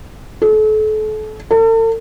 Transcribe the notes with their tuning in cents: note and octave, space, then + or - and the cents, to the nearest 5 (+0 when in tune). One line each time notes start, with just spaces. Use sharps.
A4 -35
A4 +45